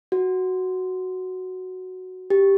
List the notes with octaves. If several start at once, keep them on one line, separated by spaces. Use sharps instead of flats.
F#4
G4